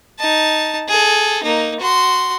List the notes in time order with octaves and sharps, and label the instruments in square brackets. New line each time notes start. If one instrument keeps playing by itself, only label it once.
[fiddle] D#4 A5
G#4 A4
A#3 D#4
F#4 C6